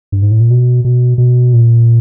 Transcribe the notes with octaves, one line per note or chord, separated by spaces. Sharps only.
G2
G#2
A2
A#2
B2
B2
B2
A#2